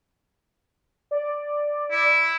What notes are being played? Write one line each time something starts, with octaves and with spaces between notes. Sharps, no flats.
D5
E4